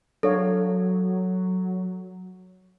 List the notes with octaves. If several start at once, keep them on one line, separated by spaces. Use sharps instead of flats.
F#3 D4 A4 C#5 F5